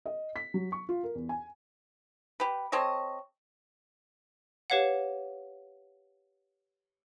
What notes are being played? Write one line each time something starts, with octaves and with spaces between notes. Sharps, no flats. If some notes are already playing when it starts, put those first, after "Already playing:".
D#5
B6
F#3
C#6
F4
A#4
E2
G#5
G4 B4
C4 A4 C#5 D#5
G4 B4 C#5 F5 F#5